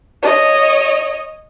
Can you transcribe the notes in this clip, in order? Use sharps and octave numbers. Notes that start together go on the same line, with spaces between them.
C#5 D#5